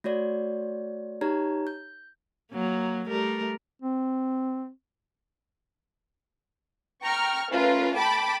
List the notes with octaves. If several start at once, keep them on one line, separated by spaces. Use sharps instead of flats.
A3 F#4 C#5 D5
D#4 G4 C#5 A#5 G#6
G6
F#3 A#3
G3 A3 A#4
C4
G5 A#5 C#6 F6
A3 C#4 F4 A#4 B4
G5 A5 B5 D6